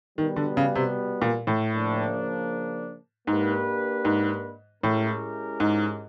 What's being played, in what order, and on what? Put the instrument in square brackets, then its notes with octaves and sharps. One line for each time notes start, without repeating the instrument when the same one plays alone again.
[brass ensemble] B2 G3 B3 [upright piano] D#3
[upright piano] D3
C#3
C3
A#2
A2
[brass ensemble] C#3 F3 A#3 D4
[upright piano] G#2 [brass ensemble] A#3 D4 G4 B4
[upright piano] G#2
[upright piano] A2 [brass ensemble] G#3 C#4 E4 G4 A#4
[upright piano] G#2